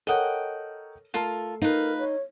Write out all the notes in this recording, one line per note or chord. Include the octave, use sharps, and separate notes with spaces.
A4 A#4 C#5 D#5 F#5 G5
A3 F4 A4 A#4
D#4 F4 A#4 B4
C#5